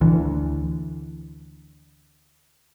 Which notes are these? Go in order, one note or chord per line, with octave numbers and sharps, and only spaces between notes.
D2 E3